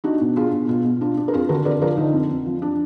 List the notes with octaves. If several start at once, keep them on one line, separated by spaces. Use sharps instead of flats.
D4 D#4 F#4
B2
D4 F4 G#4
B2
B2 F4
B2
D4 F4
D4
A#4
F2 F4 G#4
D3 F#4 A#4
D3 A#4 D5
F3 A#4 D5
D3 D#4
F2
F2
F3
D4